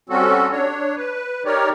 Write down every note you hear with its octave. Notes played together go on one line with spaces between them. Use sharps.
G3 C4 C#4 F#4 A4
D4 C#5
B4
D#4 G4 A#4 C#5 D5